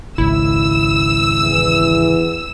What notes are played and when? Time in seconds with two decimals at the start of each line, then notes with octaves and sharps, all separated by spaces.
0.18 G#1 C#2 E4 E6
1.41 E2 E3